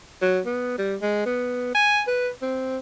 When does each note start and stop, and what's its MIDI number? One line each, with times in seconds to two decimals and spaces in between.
0.22 0.40 54
0.46 0.77 59
0.78 0.95 55
1.02 1.26 56
1.26 1.71 59
1.75 2.02 80
2.07 2.29 71
2.42 2.78 60